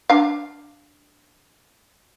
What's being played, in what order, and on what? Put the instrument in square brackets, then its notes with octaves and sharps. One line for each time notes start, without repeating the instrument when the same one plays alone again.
[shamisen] D4 F5